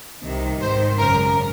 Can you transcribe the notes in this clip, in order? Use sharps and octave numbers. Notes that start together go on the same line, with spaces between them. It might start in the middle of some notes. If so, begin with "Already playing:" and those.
C2 C3 D#3
G#1 G#2 D#3 C5
G#1 F#2 C#3 A#4